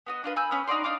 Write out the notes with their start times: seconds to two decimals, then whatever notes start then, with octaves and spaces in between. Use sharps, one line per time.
0.06 B3 F#4 D#5
0.24 D4 F4 B4
0.36 G#5 B5 E6 G6
0.51 B3 C#4 B5
0.67 D#4 F#4 D5 C6
0.84 D4 D#4 F5 D6